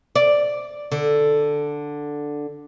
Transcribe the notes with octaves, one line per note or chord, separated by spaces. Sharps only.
D5
D3